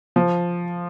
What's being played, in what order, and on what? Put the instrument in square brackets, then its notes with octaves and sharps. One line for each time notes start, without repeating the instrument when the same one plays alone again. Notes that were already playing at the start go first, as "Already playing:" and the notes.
[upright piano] F3